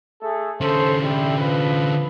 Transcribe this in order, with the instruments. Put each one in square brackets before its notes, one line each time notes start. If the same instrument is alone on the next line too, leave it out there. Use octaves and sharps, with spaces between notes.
[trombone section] A3 G#4 A4
[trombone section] D#2 A4 C5 [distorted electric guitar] D3 C#4
[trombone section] G3 E4
F3 B4